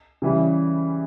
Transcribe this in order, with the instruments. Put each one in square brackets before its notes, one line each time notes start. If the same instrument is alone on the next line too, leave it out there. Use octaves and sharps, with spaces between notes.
[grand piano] C#3 E3 G3